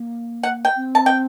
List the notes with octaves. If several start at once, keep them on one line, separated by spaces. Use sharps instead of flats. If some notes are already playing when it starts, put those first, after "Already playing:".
Already playing: A#3
F#5
G5
C4
A5
G5